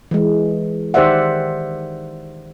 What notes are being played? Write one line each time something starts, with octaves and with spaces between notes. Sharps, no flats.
E3 G#3
D#3 G4 C5 D5 E5 F#5